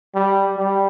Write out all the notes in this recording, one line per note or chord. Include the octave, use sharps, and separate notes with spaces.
G3
G3